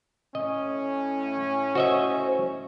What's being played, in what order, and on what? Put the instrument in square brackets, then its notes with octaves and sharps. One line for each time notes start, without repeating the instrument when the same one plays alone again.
[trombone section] A2 C#4 [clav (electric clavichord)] D#5
[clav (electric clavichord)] F#4 D#5 E5 [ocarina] C5